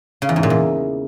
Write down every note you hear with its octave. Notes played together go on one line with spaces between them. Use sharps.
C#3
E2
G#2
A#2
E2